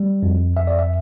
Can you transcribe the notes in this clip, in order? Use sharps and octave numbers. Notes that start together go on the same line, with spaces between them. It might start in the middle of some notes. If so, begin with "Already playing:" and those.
Already playing: G3
F2
F2 E5
D5
E5